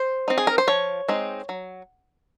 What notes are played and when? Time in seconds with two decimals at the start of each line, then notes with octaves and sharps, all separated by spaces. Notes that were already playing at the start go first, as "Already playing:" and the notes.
Already playing: C5
0.28 C4 D#4
0.38 G#4
0.47 A#4
0.58 C5
0.68 F3 C#5
1.08 G#3 C4 D#4
1.49 F#3